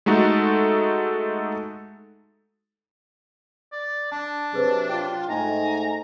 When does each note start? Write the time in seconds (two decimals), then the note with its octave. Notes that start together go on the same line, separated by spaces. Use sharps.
0.06 G#3 A3 D#4 F#4 A4
3.72 D5
4.12 D4 A5
4.53 C3 F#3 G#4 B4 C5
4.89 F4 G5
5.29 G#2 A3 D#4 G#5 A#5